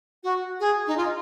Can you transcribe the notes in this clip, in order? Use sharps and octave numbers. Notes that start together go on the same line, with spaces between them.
F#4
G#4
D#4
F4